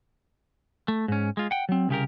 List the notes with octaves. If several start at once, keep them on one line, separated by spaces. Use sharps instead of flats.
A3
G#2 C#4
G#3 F4
F#5 G5
F#3 C4
C2 C#3 G4 A#4